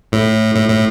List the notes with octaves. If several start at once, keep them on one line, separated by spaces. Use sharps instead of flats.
A2
A2
A2